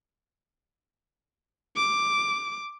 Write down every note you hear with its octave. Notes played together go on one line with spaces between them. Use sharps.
D6